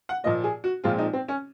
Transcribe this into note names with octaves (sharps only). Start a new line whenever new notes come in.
F#5
A#2 F3 A#3 D#5
G#4
F#4
A#2 F3 G#3 C4 F4
D#4
C4
C#4